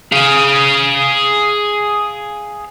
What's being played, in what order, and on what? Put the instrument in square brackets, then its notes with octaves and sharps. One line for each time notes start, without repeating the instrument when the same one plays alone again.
[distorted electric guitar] G#4 F5